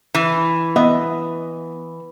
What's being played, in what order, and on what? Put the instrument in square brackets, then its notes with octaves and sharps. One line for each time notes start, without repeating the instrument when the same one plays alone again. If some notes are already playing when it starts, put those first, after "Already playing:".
[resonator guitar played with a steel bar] E3
[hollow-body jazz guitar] B3 D#5 E5